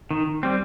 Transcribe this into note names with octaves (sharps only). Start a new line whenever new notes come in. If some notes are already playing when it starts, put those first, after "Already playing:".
D#3
G3 C4